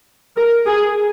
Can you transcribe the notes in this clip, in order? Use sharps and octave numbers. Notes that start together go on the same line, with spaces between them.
A#4
G#4